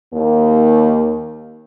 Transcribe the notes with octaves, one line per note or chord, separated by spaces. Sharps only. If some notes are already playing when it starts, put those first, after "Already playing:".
D#2 A#3